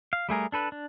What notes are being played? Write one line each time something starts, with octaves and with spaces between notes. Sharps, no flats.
F5
G3 A3 G#4 A#4
D4 A4 B4
D4